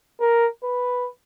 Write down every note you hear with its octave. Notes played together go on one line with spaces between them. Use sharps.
A#4
B4